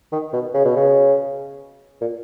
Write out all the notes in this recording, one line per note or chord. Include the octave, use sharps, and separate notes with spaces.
D#3
B2
C#3
B2
C#3
A#2